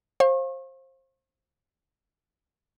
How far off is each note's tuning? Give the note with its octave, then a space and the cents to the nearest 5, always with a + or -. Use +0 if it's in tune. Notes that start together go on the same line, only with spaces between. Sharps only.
C5 +25 F5 +0 C#6 -40